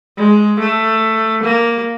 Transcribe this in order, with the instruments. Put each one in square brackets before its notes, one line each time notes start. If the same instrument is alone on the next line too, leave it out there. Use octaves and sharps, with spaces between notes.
[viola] G#3
A3
A#3